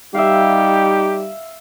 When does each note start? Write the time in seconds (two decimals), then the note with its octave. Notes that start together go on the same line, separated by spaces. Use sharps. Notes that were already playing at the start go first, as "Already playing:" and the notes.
0.14 G3 D#4 G4 E5 F5